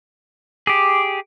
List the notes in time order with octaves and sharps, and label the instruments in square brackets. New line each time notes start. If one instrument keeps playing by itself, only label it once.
[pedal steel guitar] G4 G#4 [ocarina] D6